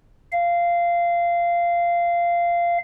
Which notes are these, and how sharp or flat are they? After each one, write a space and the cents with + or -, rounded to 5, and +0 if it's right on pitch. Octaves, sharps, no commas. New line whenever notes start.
F5 -15